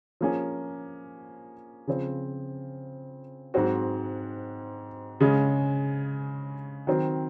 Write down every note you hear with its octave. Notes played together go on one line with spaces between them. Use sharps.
F3 A#3 C#4 G#4
C#3 F3 C4
G#2 F#3 C4 F#4
C#3 G#3 C#4
D#3 F#3 C4